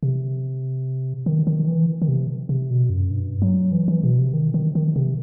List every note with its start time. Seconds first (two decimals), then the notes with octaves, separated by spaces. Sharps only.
0.03 C3
1.26 D#3
1.47 D#3
1.68 E3
2.02 D#3
2.08 C3
2.49 C3
2.70 B2
2.90 F#2
3.11 G2
3.42 F#3
3.72 E3
3.88 E3
4.03 B2
4.18 C3
4.34 D#3
4.54 D#3
4.75 D#3
4.96 C3